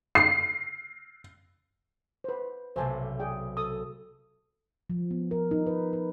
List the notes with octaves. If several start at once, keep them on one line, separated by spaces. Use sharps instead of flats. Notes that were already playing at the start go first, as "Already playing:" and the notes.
C7
B4 C5
B1 C3 A3 C5 G#5 A5
G#4 D5 G5
A4 D#6
F3
B3
A#4
D#4
B4
B4